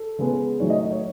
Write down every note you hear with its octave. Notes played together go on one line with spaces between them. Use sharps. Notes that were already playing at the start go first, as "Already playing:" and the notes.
Already playing: A4
C#3 G#3 B3
D#3 F#3 A3 C#5
D#5
C#5
C#5